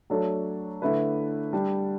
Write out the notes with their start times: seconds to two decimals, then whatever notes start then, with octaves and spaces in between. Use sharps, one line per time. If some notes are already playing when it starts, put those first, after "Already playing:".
0.10 F#3 A3 D4 A4 C#5
0.82 D3 A3 E4 B4
1.53 G3 D4 G4